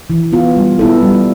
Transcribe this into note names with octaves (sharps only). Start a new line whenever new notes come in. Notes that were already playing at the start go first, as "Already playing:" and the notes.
E3
B3 F4
G3
B3 E4 A4
G3